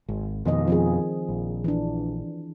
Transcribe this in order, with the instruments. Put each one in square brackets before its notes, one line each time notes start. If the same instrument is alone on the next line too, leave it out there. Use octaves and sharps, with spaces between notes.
[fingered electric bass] G#1
[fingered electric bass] F2 B2 [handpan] D#3 D#5
[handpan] F3 C4 G#4
[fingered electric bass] A#1
[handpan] E3 D4